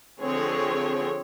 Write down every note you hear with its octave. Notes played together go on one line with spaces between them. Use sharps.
D3 F3 C4 G#4 C#5